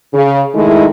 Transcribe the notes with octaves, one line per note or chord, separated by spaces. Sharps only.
C#3
D#3 G#3 A3 D#4 E4